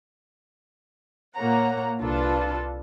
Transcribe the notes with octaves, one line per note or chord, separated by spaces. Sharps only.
A#2 A#3 C#5 F#5 A#5
C2 D4 F4 A4 B4 A5